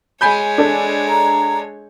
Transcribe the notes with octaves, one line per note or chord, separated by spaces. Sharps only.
G#3 C#5 G#5 B5 G6
D4 A4
A#5